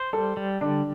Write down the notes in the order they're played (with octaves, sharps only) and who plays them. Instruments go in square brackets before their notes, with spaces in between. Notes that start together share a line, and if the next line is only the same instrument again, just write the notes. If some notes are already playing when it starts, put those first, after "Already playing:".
Already playing: [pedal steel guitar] C5
[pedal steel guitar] G3 [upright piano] A4
[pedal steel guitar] G3
[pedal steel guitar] D3 [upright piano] D4